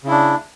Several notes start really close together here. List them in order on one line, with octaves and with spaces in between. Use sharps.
C#3 E4 D4